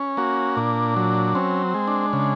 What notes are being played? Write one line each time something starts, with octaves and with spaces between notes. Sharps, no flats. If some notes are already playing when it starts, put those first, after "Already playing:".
Already playing: C#4
A#3 F#4
A#2 D4
F#3
C4 C#4
G#3
D4
C#3